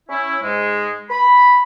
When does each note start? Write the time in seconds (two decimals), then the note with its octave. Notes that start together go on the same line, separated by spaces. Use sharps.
0.09 C#4 E4
0.43 G#2 G#3
1.11 B5